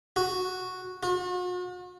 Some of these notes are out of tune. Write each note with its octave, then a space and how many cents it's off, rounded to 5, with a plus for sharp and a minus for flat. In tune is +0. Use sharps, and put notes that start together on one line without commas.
F#4 -5
F#4 -45